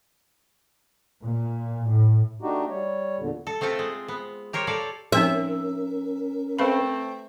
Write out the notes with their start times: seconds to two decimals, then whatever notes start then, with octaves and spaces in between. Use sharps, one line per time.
1.24 A#2
1.88 A2
2.42 A3 D4 D#4 F#4 G4
2.70 G3 C#5
3.18 E2 A#2 D3
3.47 A4
3.61 A3 C4 F4 A4 E5
3.79 G#3
4.08 B3
4.53 G4 A#4 C5 C#5
4.67 A4 C#5 D5 F5
5.12 F3 C4 C#4 D#4 A#4 E5
6.59 A3 C4 B4 F5 B5